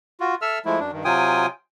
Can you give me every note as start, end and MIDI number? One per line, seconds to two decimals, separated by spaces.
0.20 0.35 65
0.20 0.35 66
0.42 0.59 69
0.42 0.59 76
0.42 0.59 88
0.42 0.59 89
0.65 0.80 53
0.65 0.80 56
0.65 0.80 57
0.65 0.80 64
0.80 0.91 42
0.80 0.91 62
0.92 1.04 43
0.92 1.04 51
1.05 1.46 48
1.05 1.46 54
1.05 1.46 65
1.05 1.46 79
1.05 1.46 80
1.05 1.46 87